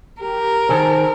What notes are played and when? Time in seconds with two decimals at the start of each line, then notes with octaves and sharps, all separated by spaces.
0.21 G4 A#4
0.69 D#3 G#4 A4 C5